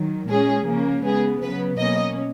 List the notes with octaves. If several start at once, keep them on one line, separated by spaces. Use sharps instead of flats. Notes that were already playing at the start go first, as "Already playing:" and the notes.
Already playing: D#3 F#3
A#2 G#3 C#4 G#4
C#3 F3 A#3 C#4
C#3 G#3 B3 G#4
C#3 F#3 B3 B4
B2 F#3 A#3 C#4 D#5